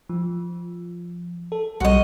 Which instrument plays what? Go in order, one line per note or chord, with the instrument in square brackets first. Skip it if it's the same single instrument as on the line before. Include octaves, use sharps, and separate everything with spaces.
[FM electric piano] F3
A4
[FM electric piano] B1 F#3 G3 [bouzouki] F#4 D#5